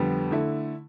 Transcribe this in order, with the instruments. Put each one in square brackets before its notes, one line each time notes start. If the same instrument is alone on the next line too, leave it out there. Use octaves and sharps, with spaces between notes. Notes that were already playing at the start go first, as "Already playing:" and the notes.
Already playing: [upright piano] F2 D3 G3 B3
D3 A3 E4